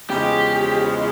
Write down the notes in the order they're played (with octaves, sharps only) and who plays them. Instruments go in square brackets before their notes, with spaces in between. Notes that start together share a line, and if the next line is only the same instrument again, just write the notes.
[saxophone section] E2 C#3 F3 G#3 [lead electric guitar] G4